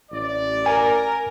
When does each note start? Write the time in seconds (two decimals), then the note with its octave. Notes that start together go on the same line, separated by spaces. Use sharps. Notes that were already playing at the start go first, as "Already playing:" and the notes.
0.11 A1 D5
0.66 A#4 G#5